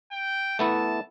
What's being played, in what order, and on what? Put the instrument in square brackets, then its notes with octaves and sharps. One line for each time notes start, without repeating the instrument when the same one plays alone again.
[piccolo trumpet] G5
[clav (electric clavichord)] A3 B3 E4 [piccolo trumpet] A5